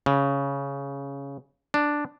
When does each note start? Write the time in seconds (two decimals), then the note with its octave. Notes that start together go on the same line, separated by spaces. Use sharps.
0.06 C#3
1.74 D4